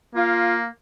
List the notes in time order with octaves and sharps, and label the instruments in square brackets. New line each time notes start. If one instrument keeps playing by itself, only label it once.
[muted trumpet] A#3 [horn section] F4